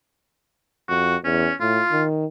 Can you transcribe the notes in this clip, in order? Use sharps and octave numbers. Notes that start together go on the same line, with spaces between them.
F2 F#4
E2 C#4
A2 F4
D#3